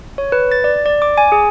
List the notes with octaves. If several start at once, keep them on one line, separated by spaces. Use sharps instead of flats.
C#5
B4
A6
D5
D5
D6
G#5
G#4